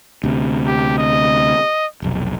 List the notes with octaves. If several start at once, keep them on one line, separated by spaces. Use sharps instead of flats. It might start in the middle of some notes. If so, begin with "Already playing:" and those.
D2 C3
G4
D#5
F1 B1